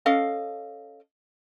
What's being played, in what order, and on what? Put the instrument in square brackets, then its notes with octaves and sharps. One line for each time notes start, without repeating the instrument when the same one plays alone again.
[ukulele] C#4 A4 D#5 F5